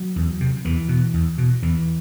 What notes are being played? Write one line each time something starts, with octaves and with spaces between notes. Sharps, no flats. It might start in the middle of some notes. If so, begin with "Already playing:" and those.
Already playing: F#3
E2
C3
E2 E3
B2
E2
B2
E2 E3